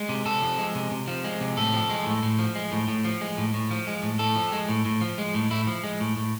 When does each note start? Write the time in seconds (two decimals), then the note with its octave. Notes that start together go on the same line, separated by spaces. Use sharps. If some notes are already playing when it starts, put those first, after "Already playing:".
Already playing: G#3
0.09 C3
0.26 C3 A4
0.42 F3
0.58 G#3
0.75 C3
0.91 C3
1.08 F3
1.24 G#3
1.41 C3
1.57 A2 A4
1.73 F3
1.90 G#3
2.06 A2
2.23 A2
2.39 F3
2.55 G#3
2.72 A2
2.88 A2
3.05 F3
3.21 G#3
3.37 A2
3.54 A2
3.71 F3
3.87 G#3
4.03 A2
4.19 A2 A4
4.36 F3
4.52 G#3
4.69 A2
4.85 A2
5.01 F3
5.18 G#3
5.35 A2
5.51 A2 E4
5.67 F3
5.84 G#3
6.00 A2
6.17 A2